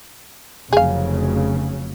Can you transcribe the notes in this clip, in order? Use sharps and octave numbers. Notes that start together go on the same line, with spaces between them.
F1 C#3 F#3 G#4 F5